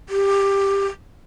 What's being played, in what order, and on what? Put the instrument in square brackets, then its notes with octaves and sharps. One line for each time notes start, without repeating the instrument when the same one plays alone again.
[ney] G4